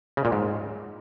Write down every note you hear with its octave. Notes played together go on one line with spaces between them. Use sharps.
C#3
A#2
G#2